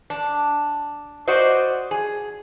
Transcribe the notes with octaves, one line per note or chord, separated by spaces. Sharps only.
D4
F#4 C5 D5 D#5
G#4